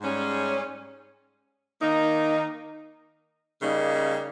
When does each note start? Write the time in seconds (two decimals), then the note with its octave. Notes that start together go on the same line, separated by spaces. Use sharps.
0.01 G#2 G3 C#4 G#4
1.82 D#3 A#3 D#4
3.62 C#3 G3 A#3 D#4